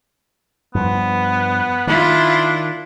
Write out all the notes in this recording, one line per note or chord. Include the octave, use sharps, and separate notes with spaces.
G2 F3 B3
D#3 D4 E4 F4